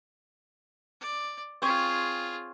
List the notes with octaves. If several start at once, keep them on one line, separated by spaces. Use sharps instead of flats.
D5
C4 F4 G#4 C#5